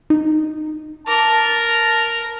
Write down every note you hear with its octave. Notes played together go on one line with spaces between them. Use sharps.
D#4
A#4 A5 D6